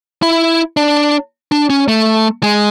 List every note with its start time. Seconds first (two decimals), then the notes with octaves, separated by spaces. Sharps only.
0.22 E4
0.77 D4
1.52 D4
1.70 C#4
1.88 A3
2.43 G#3